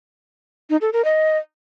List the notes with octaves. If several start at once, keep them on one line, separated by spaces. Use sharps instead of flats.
D#4
A4
A#4
D#5